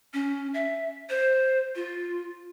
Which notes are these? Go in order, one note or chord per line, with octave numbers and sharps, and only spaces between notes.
C#4
E5
C5
F4